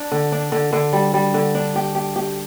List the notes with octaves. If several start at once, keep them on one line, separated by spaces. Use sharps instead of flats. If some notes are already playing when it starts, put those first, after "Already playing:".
Already playing: D4
D3
D4
D3
D3
G3
G3
D3
D4
G4
G4
G4